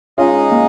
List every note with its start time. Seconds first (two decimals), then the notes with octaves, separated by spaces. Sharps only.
0.18 G#3 C#4 D#4 F4 G#4 D#5
0.51 A#3